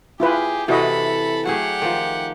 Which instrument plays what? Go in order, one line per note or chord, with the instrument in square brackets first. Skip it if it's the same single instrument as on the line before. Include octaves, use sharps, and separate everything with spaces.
[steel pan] E4 F4 B4 [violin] G4 G#4
[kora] C3 E3 [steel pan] E4 F#4 D#5 [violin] A4 B5
[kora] F#3 A3 G#4 [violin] G4 F#5
[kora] D#3 F3